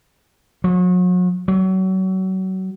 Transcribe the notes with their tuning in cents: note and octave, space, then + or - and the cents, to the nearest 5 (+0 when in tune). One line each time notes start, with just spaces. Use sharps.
F#3 -40
F#3 +30